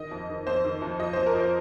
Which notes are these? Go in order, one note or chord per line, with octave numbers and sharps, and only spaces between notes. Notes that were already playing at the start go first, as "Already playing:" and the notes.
Already playing: D#3 D#5
F2
D#3
F2 C5
D#3
F2
F3 D#5
F2 C5
A#4
F3
C5